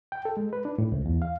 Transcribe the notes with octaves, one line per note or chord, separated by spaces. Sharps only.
G5
A4
G#3
B4
D4
A2
C#2
E2
F5